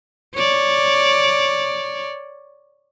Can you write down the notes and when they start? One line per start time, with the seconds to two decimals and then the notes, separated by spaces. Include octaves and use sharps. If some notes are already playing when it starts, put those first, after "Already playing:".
0.35 C#5 D5